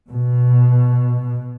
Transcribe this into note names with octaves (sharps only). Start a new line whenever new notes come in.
B2